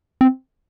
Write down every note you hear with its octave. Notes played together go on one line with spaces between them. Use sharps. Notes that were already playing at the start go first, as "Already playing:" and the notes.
C4